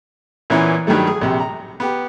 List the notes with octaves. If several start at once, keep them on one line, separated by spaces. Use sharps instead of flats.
A#2 E3 A#3 B3 C#4 E4
G2 D#3 F#3 G3 A3
G#4
A#1 C3
A#5
B3 G4